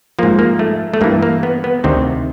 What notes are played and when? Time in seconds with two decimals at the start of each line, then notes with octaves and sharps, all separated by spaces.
0.19 G#2 F3 A#3
0.39 A#3
0.59 A3
0.94 A3
1.01 G2 E3 A#3
1.23 A#3
1.43 B3
1.64 B3
1.84 D2 C3 D#3 C4